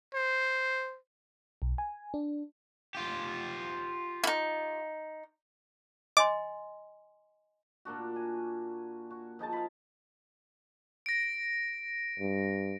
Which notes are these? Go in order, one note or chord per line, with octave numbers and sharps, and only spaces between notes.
C5
B1
G#5
D4
F4 G4
D#4 E4
D#5 G#5 C6 D6
A#2 A#3 D4 F#4
G#5
F#4
F3 D#4 G#4 A5
F5 B5
A#6 D7
G2